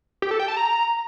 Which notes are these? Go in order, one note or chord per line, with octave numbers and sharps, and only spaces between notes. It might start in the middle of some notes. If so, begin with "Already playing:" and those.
G4
A4
G5
A5
A#5